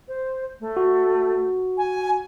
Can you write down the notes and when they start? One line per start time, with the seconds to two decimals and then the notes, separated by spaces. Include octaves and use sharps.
0.08 C5
0.60 A3
0.77 F#4
1.78 G#5